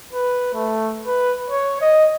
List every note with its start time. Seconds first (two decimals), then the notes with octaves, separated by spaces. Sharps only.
0.13 B4
0.54 A3
1.06 B4
1.50 C#5
1.82 D#5